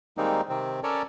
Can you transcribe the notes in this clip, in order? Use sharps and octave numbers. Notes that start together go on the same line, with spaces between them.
D#3 G3 G#3 A#3 C4 D#4
C3 D#3 C4
C#4 A4 A#4 C#5 D5